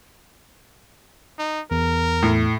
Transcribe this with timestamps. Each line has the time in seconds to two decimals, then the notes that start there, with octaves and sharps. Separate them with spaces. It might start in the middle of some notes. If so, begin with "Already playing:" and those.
1.39 D#4
1.71 E2 A#4
2.23 A2